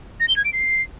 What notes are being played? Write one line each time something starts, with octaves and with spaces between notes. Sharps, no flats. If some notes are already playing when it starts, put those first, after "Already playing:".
A#6
G7
G#6
D7
C7